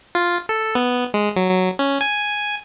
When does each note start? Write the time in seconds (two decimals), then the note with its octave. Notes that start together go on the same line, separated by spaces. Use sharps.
0.15 F4
0.49 A4
0.75 B3
1.14 G#3
1.36 F#3
1.50 F#3
1.79 C#4
2.01 G#5